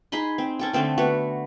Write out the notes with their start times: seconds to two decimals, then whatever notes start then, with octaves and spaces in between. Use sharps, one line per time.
0.12 D#4 G#4 B5 C6
0.38 C4
0.59 C#4 A4 G5
0.73 D3 A3 C4 A4
0.98 A3 B3 F#4